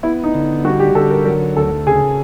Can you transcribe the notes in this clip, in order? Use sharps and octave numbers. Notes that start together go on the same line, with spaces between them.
B3 E4
D#4
D3
G3 F#4
G4
D3 A4
A#4
F#3 A#4
D2 A4
C#3 G#4